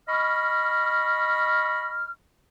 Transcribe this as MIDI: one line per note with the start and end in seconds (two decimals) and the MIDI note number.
0.08 2.11 75
0.08 2.11 83
0.08 2.11 85
0.08 2.11 89